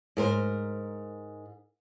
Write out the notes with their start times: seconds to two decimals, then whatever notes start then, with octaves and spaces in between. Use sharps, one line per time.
0.17 G#2 A#4 C5